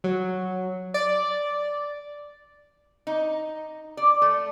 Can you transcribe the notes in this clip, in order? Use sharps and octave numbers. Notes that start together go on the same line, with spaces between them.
F#3
D5
D#4
D5
A3